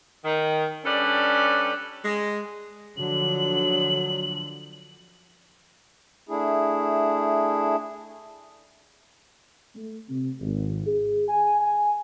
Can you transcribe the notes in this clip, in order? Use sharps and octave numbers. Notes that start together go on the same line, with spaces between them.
D#3
G3 C#4 D4 A4 B4 D5
G#3
D3 F3 F#3 F#7
A3 D4 E4 G#4
A3
C3
G#1
G#4
G#5
G#5